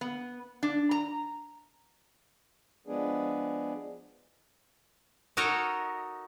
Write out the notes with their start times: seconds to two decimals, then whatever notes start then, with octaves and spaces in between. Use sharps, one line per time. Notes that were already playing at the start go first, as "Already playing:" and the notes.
0.01 B3
0.63 D4
0.91 A#5
2.87 F3 G#3 B3 D4 G#4
5.37 D#4 F#4 A4 A#4 C#5 D#5